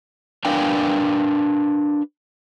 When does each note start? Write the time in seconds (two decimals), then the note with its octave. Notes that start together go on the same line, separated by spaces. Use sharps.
0.45 D4 A#4 B4 F5 G5 G#5